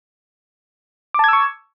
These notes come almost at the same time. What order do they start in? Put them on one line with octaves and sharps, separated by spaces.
D6 A5 G#6 E6 C#6